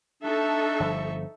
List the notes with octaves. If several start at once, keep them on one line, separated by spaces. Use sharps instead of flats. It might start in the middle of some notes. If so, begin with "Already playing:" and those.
D4 D#4 A4 E5 C#6
G1 F3